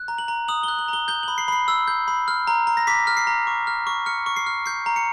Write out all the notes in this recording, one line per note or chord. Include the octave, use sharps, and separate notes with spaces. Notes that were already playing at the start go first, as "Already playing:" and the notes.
Already playing: F#6
A#5
F#7
A#5
D#6 F#7
G7
F#6
F#7
A#5 G7
G6 G7
B5 F#7
C7
B5 C7
E6
G6
B5
F6
A#5
A#5
A#6
D6 B6
F6
C7
A#5
C#6
F6
C#6
F6 C#7
C#6
C7
F6
G6 C7
A#5
C#7